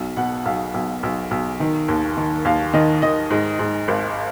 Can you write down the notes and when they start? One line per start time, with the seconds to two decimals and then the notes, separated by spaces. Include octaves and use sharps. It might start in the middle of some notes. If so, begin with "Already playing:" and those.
Already playing: B1
0.17 B2 F#5
0.45 B1 F5
0.74 B1
1.03 B1
1.31 B1
1.60 D#3
1.88 D#2
2.17 D#3
2.45 D#2 F5
2.73 D#3 D#5
3.02 D#3 D#5
3.30 G#2
3.59 G#2
3.88 G#1